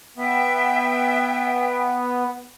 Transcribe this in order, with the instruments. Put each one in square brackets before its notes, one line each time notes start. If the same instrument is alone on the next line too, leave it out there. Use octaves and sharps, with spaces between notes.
[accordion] B3 [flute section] E5 G5